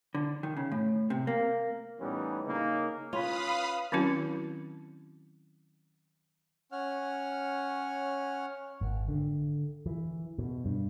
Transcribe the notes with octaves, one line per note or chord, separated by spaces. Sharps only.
D3
D#3
C#3
A2
C3
A#3
A2 E3 G3 B3 C#4 D#4
C#3 A#3 D#4
C#4 F4 B4 F5 B5 D#6
D#3 F#3 C4 C#4 E4 F#4
C#4 C#5 F#5 F6
G#1
D3
E3
B2
G2